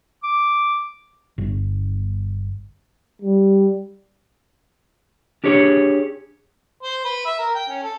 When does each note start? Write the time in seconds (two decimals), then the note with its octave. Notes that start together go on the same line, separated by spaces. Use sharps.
0.23 D6
1.38 G1
3.22 G3
5.44 D4 G4 G#4 C#5
6.83 C5
7.04 B4
7.26 E5
7.38 A#4
7.55 G5
7.69 C#4
7.83 A4